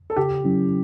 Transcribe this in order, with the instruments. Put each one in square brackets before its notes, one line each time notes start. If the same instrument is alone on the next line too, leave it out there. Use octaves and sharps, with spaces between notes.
[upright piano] A4
[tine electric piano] C#3 [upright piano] G4
[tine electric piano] F#3 C#4 E4